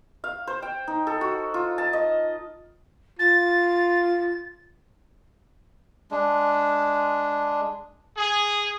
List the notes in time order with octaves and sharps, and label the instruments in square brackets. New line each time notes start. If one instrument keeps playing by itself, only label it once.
[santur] F5
C5
G5
D#4
A4
F#4
F4
A5
D#5
[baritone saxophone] F4 [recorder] A6
[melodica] G#3 D4
[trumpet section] G#4